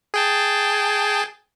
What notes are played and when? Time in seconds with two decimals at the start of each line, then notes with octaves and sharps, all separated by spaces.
0.14 G#4 G5 A5